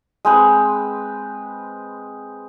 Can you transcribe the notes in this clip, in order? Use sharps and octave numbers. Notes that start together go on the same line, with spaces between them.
G#3 C4 B4